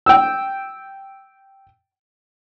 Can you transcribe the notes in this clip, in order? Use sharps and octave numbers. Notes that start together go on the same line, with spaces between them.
G5 E6